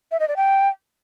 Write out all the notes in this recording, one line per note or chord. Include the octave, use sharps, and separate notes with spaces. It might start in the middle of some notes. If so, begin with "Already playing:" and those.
E5
D#5
D5
G5